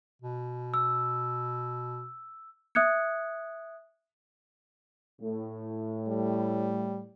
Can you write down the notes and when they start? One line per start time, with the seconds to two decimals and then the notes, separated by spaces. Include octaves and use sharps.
0.22 B2
0.74 E6
2.75 E5 D#6 F#6 G#6 C#7
5.22 A2
6.08 G3